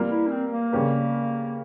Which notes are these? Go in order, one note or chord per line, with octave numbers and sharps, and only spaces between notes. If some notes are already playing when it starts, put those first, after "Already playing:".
Already playing: G3 A#3 F4 A#4
E4
C#4
C4
A#3
C#3 G3 C#4 G4 A#4